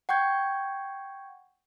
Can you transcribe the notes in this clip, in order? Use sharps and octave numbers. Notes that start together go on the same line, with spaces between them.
F#5 G5 C#6 G6 G#6